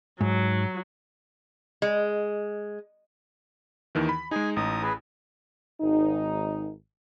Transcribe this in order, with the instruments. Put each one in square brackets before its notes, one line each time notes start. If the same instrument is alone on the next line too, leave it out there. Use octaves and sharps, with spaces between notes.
[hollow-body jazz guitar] G#2 [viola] F#3
[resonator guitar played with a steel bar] G#3
[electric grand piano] D#2 D#3 E3
B5
[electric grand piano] G#3 D#4 [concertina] G#4 G#5
[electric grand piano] A1 [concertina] D#4 D#6
[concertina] G#4 B4
[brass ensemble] G#1 D#4